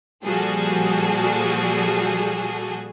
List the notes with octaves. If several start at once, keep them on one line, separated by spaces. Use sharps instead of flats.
A#2 F3 G3 F#4 G#4 A4